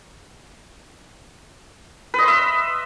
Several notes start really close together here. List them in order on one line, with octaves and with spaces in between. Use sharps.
B4 D#5 C6 E5